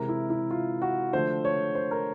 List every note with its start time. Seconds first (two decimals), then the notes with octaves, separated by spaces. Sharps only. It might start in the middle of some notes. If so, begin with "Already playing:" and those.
Already playing: C3 E3 G#3 A#4
0.09 E4
0.30 E4
0.51 F4
0.82 F#4
1.13 D3 F3 A3 C5
1.45 C#5
1.75 C5
1.91 A#4